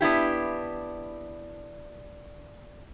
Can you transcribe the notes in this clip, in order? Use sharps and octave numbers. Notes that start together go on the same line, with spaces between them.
B3 D4 E4 G4